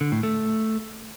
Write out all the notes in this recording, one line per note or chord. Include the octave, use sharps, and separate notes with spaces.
D3
A2
A3